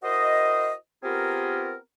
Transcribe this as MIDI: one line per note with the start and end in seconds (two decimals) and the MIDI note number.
0.03 0.72 64
0.03 0.72 66
0.03 0.72 70
0.03 0.72 72
0.03 0.72 75
1.03 1.74 59
1.03 1.74 60
1.03 1.74 65
1.03 1.74 67
1.03 1.74 68
1.03 1.74 70